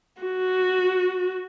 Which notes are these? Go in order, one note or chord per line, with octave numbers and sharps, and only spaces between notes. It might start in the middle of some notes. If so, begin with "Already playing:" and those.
F#4